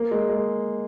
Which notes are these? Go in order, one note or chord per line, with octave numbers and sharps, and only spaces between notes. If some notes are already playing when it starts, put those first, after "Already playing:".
Already playing: A#3
G#3
G#3